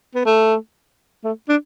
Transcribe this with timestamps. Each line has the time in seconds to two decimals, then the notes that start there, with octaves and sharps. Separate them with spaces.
0.15 B3
0.26 A3
1.24 A3
1.49 D4